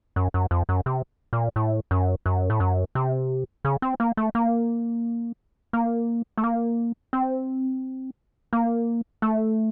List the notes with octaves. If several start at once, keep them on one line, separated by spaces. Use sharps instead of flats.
F#2
F#2
F2
F#2
C3
A#2
A2
F#2
F#2
A2
F#2
C3
C#3
C4
A#3
A3
A#3
A#3
A3
A#3
C4
A#3
A3